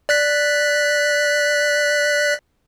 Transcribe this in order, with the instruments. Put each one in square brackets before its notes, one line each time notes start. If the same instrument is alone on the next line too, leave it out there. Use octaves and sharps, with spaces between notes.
[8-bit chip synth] D5 F#6 B6